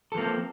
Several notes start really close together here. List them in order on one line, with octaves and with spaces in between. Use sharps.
A4 F3 A#3 C4